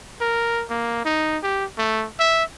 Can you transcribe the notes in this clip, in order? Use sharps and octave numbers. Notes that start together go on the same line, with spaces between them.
A#4
A#3
D#4
G4
A3
E5